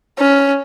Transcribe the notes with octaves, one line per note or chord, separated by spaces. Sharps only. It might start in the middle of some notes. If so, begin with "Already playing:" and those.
C#4